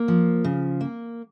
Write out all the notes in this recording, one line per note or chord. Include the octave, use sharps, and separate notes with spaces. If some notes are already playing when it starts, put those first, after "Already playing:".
Already playing: A#3
F3
C#3
A#3